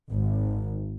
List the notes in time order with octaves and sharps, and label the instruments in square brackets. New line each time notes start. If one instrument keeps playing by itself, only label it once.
[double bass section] G#1